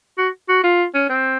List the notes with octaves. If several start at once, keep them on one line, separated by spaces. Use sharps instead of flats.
F#4
F#4
F4
C#4
C4